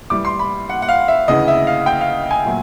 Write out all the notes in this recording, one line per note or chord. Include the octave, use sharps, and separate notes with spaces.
A2 E3 G3 D6
C6
B5
F#5
F#5
F5
E5
D2 C#3 E3 D#5
E5
F5
G5
F5
G#5
A#2 F#3 A3